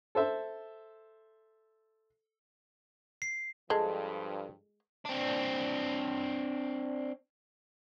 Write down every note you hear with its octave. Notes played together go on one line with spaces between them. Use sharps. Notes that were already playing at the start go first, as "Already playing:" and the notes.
A4 C5 E5
C7
G2 F3 G#3 A4
C4 D4